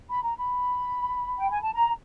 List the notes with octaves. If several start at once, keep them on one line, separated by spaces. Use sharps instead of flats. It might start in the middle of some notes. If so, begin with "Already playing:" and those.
B5
A#5
B5
G5
G#5
A5
A#5